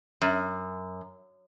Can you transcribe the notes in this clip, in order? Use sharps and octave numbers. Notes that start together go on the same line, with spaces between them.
F#2